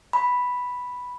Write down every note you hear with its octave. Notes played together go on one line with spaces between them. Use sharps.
B5